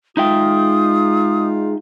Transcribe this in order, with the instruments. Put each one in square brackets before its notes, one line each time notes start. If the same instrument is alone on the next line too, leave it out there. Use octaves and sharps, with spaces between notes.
[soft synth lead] G#3 [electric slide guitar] D#4 E5 G5 [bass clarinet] F4 [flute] D#6